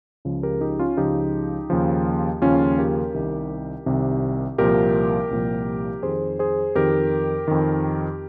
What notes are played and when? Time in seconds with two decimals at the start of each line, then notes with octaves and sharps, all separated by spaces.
0.25 C#2 C#3 F3
0.43 G4 A#4
0.61 D#4 G4
0.79 C#4 F4
0.97 C#2 C#3 F3 D#4 G4
1.70 D#2 C#3 F3
2.42 D#2 C#3 F3 C#4 F4
2.78 G4 A#4
3.14 C2 C3 D#3
3.86 C2 C3 D#3
4.58 C2 A#2 F3 G4 A#4
5.31 C2 A#2 F3
6.03 F2 D#3 G#4 C5
6.39 G#4 C5
6.75 F2 D#3 G4 A#4
7.48 F2 D#3